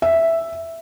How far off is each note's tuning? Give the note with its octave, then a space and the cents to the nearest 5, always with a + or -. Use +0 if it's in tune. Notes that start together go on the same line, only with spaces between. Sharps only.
E5 +0